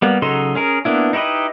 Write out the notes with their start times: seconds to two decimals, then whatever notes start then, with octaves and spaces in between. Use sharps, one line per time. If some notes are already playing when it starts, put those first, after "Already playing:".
0.02 G3 A#3 B3
0.22 C#3 F#3 D#4 A4 C6
0.55 C#4 G#4 A#4
0.85 A#3 B3 D4 E4
1.13 D#4 E4 G4 B4 D#5